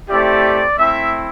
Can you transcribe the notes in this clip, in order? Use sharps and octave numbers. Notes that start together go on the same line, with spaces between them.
A3 C4 E4 G4 D5
A3 C4 E4 E5